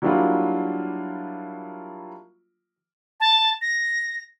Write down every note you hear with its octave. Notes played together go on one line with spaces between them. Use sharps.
F#3 G3 A#3 D4 E4 F4
A5
A#6